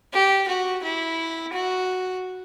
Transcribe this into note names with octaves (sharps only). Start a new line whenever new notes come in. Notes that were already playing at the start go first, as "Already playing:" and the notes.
G4
F#4
E4
F#4